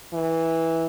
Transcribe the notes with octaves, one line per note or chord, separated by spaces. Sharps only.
E3